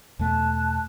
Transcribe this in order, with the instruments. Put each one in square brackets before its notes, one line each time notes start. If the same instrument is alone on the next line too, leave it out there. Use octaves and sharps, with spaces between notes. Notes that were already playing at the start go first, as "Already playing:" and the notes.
[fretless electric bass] E2 B2 A3 [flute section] A5 F#6